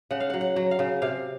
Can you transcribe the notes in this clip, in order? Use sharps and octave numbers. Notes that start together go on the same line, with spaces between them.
C#3 F#5
F5
F#3 F#5
F#5
F#3
F5
C#3
C3 F5